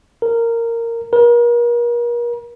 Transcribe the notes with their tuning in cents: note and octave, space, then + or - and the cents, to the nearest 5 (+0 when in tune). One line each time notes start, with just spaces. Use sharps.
A#4 -10
A#4 +40